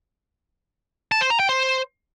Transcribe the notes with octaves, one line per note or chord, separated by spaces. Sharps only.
A5
C5
A#5
G5
C5